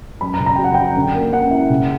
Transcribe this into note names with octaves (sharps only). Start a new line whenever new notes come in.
F#2 B5
A#5
C#3
A#5
F#3 G5
F#5
F#2 G5
D3
A#3
C#4 F#5
E4
C#3